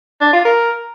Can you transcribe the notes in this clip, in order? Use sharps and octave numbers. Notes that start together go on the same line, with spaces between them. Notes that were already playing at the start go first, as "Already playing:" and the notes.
D4
F4
A#4